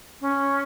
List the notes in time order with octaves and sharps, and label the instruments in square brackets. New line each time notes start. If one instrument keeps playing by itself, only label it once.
[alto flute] C#4